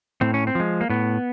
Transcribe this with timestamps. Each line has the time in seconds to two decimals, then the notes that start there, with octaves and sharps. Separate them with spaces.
0.21 A2 C4
0.34 C#4
0.47 C4
0.55 F3 G#3
0.81 A#3
0.90 A2 B3